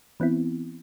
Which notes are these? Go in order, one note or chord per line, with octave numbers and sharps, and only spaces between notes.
E3 B3 C4 E4